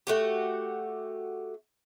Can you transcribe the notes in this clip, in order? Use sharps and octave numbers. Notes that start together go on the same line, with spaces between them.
A3 F#4 G4